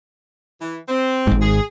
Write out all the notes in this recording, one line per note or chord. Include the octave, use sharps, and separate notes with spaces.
E3
C4
G#1 G#2
G#4